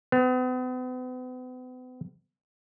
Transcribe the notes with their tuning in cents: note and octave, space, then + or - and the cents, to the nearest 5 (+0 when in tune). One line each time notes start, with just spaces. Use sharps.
B3 +40